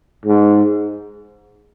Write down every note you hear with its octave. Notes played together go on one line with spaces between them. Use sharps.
G#2